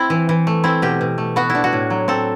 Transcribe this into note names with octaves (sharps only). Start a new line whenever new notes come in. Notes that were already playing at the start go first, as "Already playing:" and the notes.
Already playing: C4 E4
E3
E3
A3
C4 E4
B2 G4
B2
A3
B3 F#4
E4
D4
F#4
A2
F#3
C4 A4